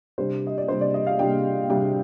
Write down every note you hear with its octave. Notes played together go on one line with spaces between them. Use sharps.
C3 G3 D4 C5
D#5
D5
C3 G3 D4 C5
D5
D#5
F5
C3 G3 D4 G5
C3 G3 D4 G5